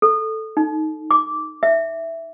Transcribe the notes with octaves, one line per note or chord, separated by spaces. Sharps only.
A4
D#4
D6
E5